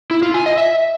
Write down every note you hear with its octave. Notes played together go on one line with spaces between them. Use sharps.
E4
F4
G#5
D#5
E5